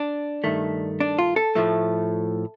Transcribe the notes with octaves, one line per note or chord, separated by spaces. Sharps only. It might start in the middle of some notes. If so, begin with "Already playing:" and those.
Already playing: D4
G2 D#3 A3
D4
F4
A4
A2 F3 A3